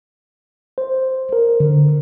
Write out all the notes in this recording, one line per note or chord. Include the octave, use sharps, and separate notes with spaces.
C5
A#4
D3